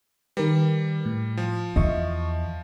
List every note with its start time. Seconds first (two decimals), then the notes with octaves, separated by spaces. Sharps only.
0.37 D#3 G3 A#4 B4
1.05 A2
1.37 F3
1.76 E2 D#5 E5 C#6